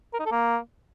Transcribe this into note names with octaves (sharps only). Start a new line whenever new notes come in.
A#4
D#4
A4
A#3